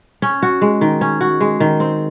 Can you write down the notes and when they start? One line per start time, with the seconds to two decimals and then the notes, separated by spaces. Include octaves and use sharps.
0.22 C#4
0.43 F#4
0.62 G#3
0.81 D#3
1.01 C#4
1.21 F#4
1.40 G#3
1.60 D#3
1.80 C4